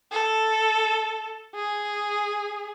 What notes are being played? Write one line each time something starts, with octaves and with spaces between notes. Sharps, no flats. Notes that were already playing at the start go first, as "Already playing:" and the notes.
A4
G#4